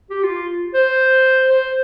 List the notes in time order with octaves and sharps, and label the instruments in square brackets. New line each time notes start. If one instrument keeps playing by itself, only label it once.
[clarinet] G4
F4
C5
C5